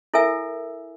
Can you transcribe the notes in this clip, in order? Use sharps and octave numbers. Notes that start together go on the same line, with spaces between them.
E4 A4 A#4 E5 G#5 E6